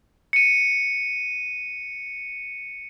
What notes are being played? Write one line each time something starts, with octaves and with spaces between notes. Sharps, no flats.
C#7 D#7